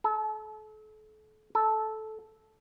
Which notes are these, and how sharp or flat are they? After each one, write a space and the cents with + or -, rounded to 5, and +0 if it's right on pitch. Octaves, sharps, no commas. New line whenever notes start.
A4 -35
A4 -10